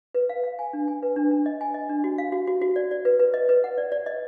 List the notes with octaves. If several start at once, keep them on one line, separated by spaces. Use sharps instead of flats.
B4
F5
F5
G#5
D4
G#5
B4
D4
D4
D#5
G#5
D#5
D4
F#4
F5
F#4
F#4
F#4
D5
D5
B4
B4
D#5
B4
F#5
D5
D5
D#5